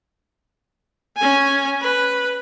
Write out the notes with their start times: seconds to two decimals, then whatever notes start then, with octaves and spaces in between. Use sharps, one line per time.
1.17 C#4 G#5
1.81 B4